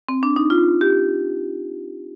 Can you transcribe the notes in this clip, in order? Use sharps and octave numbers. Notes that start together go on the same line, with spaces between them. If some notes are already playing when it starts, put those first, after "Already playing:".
C4
D4
D#4
F4
G4